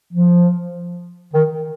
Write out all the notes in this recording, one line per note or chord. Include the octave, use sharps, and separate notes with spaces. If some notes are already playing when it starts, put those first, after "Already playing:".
F3
D#3